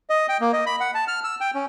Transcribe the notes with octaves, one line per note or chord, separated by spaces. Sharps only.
D#5
G5
A#3
D#5
B5
F#5
A5
F6
E6
G5
C#4